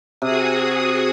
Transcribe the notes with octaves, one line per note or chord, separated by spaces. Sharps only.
C3 F#4 G#4 D#6